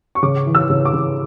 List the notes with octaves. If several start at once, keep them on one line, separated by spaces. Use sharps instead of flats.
C#6
C#3 D6
E3
E6
C#3
D6
C#3